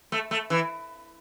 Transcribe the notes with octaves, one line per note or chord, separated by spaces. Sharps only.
A3
A3
E3